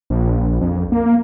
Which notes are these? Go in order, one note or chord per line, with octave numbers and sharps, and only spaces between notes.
A#1
F2
A#3